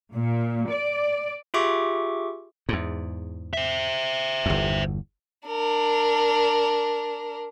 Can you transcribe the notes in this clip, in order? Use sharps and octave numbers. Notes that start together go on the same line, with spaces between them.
A#2
D5
F4 G4 G#4 E5 C#6 D6
E2 G#2
C5 E5
G1 E2
D4 A#4